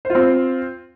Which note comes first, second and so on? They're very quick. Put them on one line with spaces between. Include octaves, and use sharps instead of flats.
C5 F4 C4